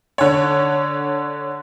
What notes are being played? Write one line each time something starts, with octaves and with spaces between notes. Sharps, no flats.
D3 C#5